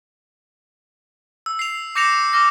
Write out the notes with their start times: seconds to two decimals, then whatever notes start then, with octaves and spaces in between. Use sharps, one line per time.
1.46 E6
1.59 C7 F7
1.95 D6 G6 A#6 C#7 E7 F7
2.33 D6 F6 A#6